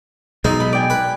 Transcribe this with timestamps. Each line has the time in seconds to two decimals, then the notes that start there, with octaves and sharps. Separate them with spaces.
0.45 B1 B2 G#3 D#4
0.60 B5
0.73 D5 G5 G#5
0.90 B4